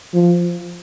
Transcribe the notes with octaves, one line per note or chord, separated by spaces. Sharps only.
F3